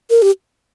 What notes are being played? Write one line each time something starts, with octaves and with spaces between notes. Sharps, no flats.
A#4
G4